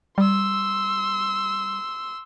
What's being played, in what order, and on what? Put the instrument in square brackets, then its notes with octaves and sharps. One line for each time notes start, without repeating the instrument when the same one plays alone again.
[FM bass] G3 [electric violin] C6 E6